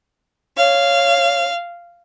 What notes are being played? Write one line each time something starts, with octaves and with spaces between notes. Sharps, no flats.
C#5 F5